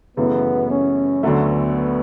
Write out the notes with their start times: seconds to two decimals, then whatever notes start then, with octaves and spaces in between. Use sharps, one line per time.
0.17 F#2 C#3 E3 A3 B3
0.70 C#4
1.23 D2 D3 F#3 A3 B3